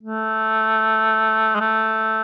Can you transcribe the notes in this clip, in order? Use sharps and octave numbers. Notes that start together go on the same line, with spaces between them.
A3
G#3
A3